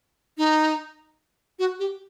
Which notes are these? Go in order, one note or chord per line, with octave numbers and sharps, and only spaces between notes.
D#4
F#4
G4